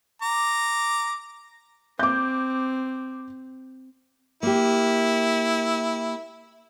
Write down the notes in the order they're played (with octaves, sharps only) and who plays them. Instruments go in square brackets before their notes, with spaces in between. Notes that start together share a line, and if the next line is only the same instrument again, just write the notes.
[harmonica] A#5 D6
[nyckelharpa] C4 [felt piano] D6 G6
[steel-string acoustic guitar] A#3 G4 [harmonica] E4